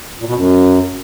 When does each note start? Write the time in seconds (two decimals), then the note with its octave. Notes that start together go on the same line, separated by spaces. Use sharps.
0.19 A#2
0.27 B2
0.35 F#2